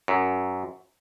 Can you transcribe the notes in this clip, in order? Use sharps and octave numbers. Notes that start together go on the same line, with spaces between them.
F#2